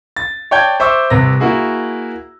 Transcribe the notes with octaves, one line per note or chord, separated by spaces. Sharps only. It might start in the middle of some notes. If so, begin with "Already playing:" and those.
A6
C#5 D5 G5 A5 G6 G#6
C5 E5 C#6 D6 E6
C2 C3 B4 A#6
A#3 E4 F#4 G#4